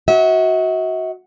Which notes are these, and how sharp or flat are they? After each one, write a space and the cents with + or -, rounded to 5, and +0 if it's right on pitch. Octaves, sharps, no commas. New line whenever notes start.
F#4 +0 E5 -45